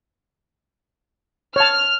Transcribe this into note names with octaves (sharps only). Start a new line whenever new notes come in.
C#5 A5 F6